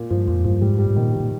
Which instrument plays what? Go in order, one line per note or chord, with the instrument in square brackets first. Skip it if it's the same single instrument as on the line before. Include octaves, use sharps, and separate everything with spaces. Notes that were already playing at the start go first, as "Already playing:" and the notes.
Already playing: [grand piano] A#2
[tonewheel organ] G2 [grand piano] F3
[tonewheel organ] F2 [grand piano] A#2
[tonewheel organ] G2 [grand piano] F3
[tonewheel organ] G#2 [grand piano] G3
[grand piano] G3
[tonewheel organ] G#2
[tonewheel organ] A#2 [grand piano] D#3
[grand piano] G3
[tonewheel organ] A#2